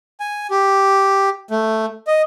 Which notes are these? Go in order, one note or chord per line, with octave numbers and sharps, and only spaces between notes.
G#5
G4
A3
D#5